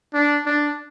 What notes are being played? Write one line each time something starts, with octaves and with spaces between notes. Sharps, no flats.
D4
D4